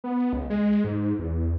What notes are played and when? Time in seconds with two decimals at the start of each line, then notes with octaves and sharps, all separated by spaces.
0.04 B3
0.33 C#2
0.50 G#3
0.84 G#2
1.19 E2